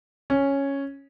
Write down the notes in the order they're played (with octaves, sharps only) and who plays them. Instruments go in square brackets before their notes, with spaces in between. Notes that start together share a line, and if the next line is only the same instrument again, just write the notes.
[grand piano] C#4